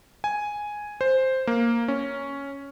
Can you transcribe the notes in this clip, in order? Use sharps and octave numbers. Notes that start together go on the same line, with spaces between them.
G#5
C5
A#3
C#4